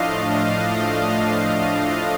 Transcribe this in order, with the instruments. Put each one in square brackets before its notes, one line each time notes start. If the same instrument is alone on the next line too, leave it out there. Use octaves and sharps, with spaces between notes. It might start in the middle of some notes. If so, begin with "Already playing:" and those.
Already playing: [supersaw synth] A2 F3 A3 D4 D#5 F5